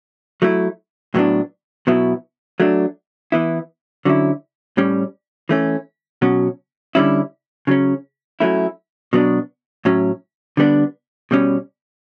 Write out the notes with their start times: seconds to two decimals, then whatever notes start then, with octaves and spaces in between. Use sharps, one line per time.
0.42 F#3 A3 E4
1.15 A2 F#3 B3 D4
1.87 B2 F#3 B3 E4
2.60 F#3 A3 D4
3.32 E3 B3 E4
4.05 D3 F#3 C#4 E4
4.77 A2 G3 C#4
5.49 E3 A3 C#4
6.22 B2 F#3 C#4
6.95 D3 G3 C#4 E4
7.67 C#3 F#3 C#4
8.40 F#3 A3 C#4 E4
9.13 B2 F#3 B3 D4
9.85 A2 F#3 C#4
10.57 D3 G3 B3 D4
11.31 B2 G3 C#4